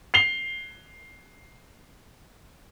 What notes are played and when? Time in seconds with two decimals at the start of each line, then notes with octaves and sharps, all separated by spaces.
0.14 C7 F7 G7